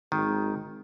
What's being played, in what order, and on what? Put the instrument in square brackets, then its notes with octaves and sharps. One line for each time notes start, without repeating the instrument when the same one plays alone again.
[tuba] G#1 [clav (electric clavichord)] D#3